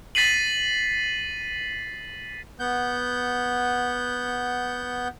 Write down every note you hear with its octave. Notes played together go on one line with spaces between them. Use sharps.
A6 B6 C7 D#7 F#7
B3 F#5 G6